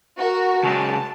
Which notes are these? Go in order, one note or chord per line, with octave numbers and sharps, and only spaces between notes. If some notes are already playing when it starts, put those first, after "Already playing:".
F#4 A#4
C#3 F#3 G#3 A5